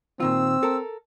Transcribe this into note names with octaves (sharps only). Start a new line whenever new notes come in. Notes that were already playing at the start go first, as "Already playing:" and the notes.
A#2 D#3 C4 F4 E6
A4 A#4